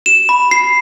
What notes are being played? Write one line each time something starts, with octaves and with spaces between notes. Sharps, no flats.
E7
B5
C7